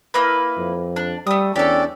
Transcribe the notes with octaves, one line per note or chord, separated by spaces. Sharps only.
A#3 E4 B4
F2
D4
G3 A3 D#6
E2 C#4 D4 G4 A4 D5